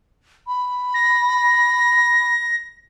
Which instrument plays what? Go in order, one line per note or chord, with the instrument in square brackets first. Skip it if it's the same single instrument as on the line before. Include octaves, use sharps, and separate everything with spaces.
[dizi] B5
[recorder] A#6